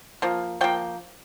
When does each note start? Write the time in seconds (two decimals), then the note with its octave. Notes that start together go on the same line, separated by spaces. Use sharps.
0.22 F3 A#3
0.61 F3 A#3 G5